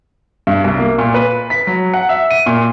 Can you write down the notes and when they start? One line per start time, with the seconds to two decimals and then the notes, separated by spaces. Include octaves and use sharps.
0.47 G2
0.64 C2
0.79 A#3
0.98 A#2
1.14 B4
1.50 B6
1.67 F#3
1.94 F#5
2.09 E5
2.31 D#7
2.46 A#2